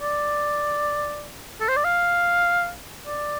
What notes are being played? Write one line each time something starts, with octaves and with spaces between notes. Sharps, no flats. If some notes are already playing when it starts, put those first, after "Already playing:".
D5
A4
C5
D5
F5
D5